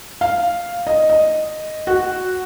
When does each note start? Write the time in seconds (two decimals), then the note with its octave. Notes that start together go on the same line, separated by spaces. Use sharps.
0.21 F5
0.87 D#5
1.10 D#5
1.87 F#4